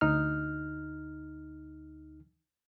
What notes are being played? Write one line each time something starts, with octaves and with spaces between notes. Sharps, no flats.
D2 D#4 F6